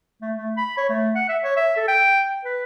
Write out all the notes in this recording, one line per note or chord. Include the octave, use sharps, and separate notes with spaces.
A3
A3
B5
C#5
A3
F#5
E5
C#5
E5
A4
G5
B4